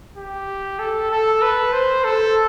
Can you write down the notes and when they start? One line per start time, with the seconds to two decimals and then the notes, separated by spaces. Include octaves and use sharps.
0.17 G4
0.79 A4
1.11 A4
1.42 B4
1.73 C5
2.04 A4